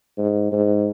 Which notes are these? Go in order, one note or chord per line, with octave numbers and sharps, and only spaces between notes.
G#2
G#2